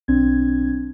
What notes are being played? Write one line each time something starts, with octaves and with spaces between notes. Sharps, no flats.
B1 C4 D4 G#6